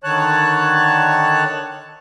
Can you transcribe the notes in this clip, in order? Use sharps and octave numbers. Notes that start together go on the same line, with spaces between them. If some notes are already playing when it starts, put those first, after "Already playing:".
D3 D#3 C#5 A5 F#6